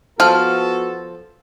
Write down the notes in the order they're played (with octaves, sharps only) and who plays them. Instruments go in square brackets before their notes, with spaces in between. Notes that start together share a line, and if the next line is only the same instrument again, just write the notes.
[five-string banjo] F3 [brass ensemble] B3 F#4 A4 [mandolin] F6